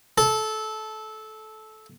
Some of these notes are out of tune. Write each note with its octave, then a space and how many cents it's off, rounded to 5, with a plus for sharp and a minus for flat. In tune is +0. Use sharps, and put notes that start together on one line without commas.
A4 -15